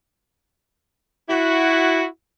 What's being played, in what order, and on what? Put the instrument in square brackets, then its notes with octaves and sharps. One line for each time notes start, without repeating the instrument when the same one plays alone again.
[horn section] E4 F#4